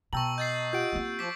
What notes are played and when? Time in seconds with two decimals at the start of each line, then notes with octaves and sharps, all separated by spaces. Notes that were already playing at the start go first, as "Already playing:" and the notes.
0.13 B2 G5 A5 A#5 C#6 E6 F#7
0.38 D#5 G6 A6 C7
0.73 F4 G4 F#5 G6 D7
0.92 A#3 C4
1.19 F3 D6 B6